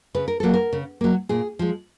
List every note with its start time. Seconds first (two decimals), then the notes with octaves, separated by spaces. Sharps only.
0.14 C#3 B4
0.28 A#4
0.40 F#3 A#3 A4
0.54 A#4
0.73 C#3
1.01 F#3 A#3
1.29 A#2 G#4
1.59 F3 G#3